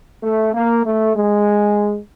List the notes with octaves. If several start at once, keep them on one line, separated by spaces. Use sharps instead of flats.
A3
A#3
A3
G#3